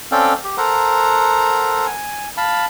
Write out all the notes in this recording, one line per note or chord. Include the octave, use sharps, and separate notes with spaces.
C4 C#4 A4 D5 F5 G5
G4
A4 A#4 C5 F#5 A#5
G#5
F5 A5 B5